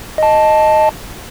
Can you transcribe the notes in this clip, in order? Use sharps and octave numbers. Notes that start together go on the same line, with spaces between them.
D#5 A5